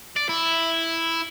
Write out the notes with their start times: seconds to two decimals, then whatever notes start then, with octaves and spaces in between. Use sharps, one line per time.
0.16 D5
0.29 E4